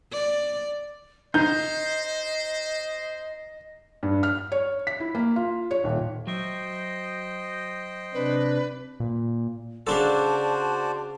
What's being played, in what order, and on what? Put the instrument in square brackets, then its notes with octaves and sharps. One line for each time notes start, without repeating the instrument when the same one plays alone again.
[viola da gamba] D5
[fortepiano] D#4 [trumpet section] C5 [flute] D#5 [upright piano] G6
[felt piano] G2
F6
C#5
B6
E4
A#3
F4
C#5
D#1
[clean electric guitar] F#3 E5 [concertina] C5 D#5 G5
[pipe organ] C3 D4 [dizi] B4
[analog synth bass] A#2
[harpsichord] C#3 D4 A4 [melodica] F#4 C5 D5 [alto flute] A5